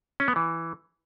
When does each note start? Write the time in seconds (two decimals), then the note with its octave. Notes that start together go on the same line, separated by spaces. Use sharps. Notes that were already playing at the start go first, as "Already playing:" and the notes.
0.20 C#4
0.28 B3
0.36 E3